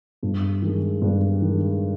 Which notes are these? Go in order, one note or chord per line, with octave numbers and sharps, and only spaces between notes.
G2
D#3 G#3
G2
D#3 G#3